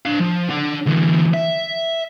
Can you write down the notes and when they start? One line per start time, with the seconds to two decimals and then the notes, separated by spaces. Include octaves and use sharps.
0.05 D4 F5
0.19 F3
0.49 D4 F#5
0.86 D2 E3
1.34 E5